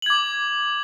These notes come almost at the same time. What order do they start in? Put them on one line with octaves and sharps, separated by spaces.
F#7 G#6 D6